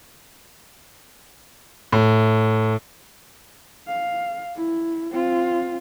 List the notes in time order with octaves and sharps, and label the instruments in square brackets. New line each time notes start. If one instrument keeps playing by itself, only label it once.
[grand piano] A2
[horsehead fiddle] F5
E4
C4 F4